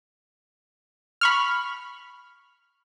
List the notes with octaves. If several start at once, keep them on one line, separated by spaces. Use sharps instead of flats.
B5 C#6 F6